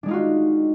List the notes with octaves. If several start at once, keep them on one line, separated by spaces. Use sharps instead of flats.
G#3 D4 D#4 F4 F#4